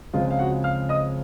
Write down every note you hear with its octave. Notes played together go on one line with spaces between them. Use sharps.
C#2 C#3 F3 G#3 C4 F4 F5
F5
F#4 F#5
F5 F6
D#5 D#6